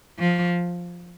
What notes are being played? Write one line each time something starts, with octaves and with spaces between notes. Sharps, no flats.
F3